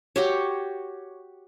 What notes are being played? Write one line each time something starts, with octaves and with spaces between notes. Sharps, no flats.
F#4 G4 C#5